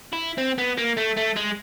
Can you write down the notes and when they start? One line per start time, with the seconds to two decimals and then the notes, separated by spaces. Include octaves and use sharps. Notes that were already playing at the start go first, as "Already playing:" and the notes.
0.13 E4
0.38 C4
0.58 B3
0.77 A#3
0.97 A3
1.17 A3
1.36 G#3